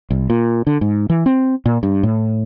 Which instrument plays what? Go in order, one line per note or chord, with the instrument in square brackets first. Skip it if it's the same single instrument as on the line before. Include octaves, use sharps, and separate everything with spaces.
[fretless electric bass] C2
A#2
D3
G#2
E3
C4
A#2
G2
A2